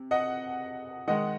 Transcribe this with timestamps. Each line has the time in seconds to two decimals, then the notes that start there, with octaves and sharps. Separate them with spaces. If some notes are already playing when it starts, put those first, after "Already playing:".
Already playing: C3
0.11 D#5 F#5
1.08 D#3 G#3 D#5 F#5